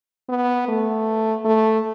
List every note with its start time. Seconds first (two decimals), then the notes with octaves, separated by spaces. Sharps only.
0.29 B3
0.68 A3
1.45 A3